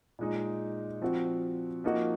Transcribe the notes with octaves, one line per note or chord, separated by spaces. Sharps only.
A#2 G#3 D#4
F3 C4 F#4
F3 A#3 D#4 F#4